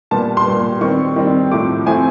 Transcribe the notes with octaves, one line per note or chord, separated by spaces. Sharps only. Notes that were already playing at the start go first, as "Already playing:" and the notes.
A#2 G3 B3 A5
C6
A#2 G3 B3
D#3 G3 C4 C#6
D#3 G3 C4
A2 F3 A3 C4 D6
A2 F3 A3 C4 G#5